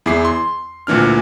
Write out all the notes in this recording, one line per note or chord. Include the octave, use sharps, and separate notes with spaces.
E2 E4 G#4 D6 C7
C6
D2 A#2 E3 D4 F6